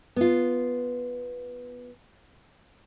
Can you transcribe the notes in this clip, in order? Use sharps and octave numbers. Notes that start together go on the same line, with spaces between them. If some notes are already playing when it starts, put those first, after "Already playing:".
B3 F4